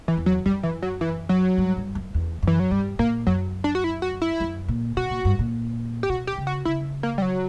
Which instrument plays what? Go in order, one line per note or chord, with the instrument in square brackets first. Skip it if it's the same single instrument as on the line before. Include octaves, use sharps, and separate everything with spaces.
[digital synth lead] E3
[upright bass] E2
[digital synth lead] F#3
[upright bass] F#2 [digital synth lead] G3
[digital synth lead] E3
F#3
E3
F#3
[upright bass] G2
G2
F#2
E2
[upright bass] F#2 [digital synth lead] E3
[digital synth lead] F#3
[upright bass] G2 [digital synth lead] G3
[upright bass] A#2 [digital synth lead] A#3
[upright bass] F#2 [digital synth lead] F#3
[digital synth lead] D4
F#4
E4
F#4
E4
[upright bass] F#2
A#2
[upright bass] B2 [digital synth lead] F#4
[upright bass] A#2
G2
A#2
[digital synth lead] G4
[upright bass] B2 [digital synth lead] F#4
[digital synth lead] G4
[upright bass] C#3
[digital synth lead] F#4
[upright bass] C#3 [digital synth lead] E4
[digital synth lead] A#3
G3
F#3